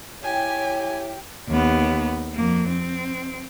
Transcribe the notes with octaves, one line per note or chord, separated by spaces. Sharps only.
E4 G4 C#5 G#5
D#2 B3
F2 A#3
C4